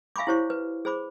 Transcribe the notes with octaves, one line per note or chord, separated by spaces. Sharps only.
E5 F5 G#5 B5 C#6 D6
E4 G4 C5 C#5 C#6
B4
G#4 C5 B5 D6